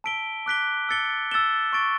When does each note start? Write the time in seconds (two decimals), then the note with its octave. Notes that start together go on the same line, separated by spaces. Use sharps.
0.04 A5 E6 B6 D7 G7
0.46 D6 F#6 B6 D7 G7
0.89 E6 A6 C#7 G7
1.31 E6 A6 E7 G7
1.73 C#6 E6 A6 D7 G7